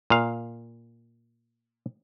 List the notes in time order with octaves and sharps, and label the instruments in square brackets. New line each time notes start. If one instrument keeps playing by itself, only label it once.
[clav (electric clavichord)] A#2 F5